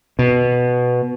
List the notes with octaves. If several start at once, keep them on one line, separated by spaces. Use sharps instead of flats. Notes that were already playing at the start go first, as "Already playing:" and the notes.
B2